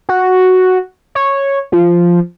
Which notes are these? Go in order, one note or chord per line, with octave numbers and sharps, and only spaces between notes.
F#4
C#5
F3